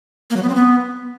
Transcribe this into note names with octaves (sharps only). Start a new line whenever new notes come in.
A#3
F#3
B3
C4
B3